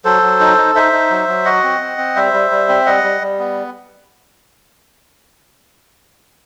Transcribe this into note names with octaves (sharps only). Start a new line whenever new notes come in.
F#3 A4 C5
F#3
D#4
D#4
D#4 C5 E5
D#4
F#3
F#3
F#4 D#5 F#5
C4
C4
C4
G3 C5 E5
G3
G3
C4
G3 D#5 F#5
G3
G3
B3